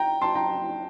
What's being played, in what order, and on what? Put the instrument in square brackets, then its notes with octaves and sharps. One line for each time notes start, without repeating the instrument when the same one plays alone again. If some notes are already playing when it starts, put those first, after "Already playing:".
Already playing: [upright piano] G5 A#5
A5 C6
G5 A#5